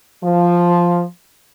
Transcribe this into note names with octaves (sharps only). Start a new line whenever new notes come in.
F3